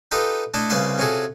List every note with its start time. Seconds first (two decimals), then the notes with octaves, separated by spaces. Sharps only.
0.11 D#4 F4 G4 A4 B4 D#5
0.54 A3 D4 E4 A4 D#5
0.70 C2 C#3 G3 B4 F5 C6
0.98 C3 C#4 F4 F#4 G#4 A4